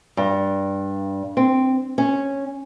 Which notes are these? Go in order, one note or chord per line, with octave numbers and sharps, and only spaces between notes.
G2
C4
C#4